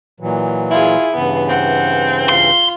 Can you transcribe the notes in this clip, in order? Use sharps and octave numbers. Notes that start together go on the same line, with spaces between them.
A#2 E3 F#3
E4 F4 G#4
G2 C#3 E3 B3
C4 F#5
F4 C6